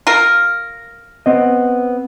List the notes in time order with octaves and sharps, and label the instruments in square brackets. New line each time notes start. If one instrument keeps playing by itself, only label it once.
[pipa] F4 A#4
[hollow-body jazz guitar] B3 C4 D#5